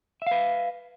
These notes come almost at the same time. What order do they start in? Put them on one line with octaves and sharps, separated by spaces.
E5 F5 B4